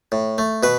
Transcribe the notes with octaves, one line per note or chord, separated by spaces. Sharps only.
A2
A3
B2 B4